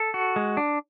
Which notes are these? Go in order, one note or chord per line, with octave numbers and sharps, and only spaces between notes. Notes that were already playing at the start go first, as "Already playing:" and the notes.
Already playing: A4
F#4
G#3
D4